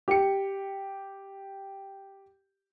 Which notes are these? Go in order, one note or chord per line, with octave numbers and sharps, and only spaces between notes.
G4 C#7